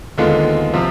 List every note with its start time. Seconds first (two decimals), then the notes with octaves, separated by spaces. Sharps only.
0.18 D#2 D3 G#3 B3 F4
0.74 C3 F3 C4 F4